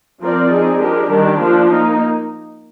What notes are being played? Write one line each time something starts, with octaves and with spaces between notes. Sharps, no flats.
F3 C4 F4 A#4 D5
C4 D#4 G#4
F3 G#3 D4 G4 A#4
D#3 G3 D4 G4
F3 A#3 D4 F4
A#3 D#4